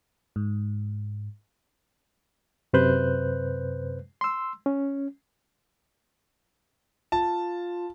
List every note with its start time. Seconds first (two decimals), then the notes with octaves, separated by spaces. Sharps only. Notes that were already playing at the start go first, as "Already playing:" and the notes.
0.36 G#2
2.73 F#2 C3 B4 C5 F#6 G6
4.21 C6 E6
4.66 C#4
7.12 F4 A5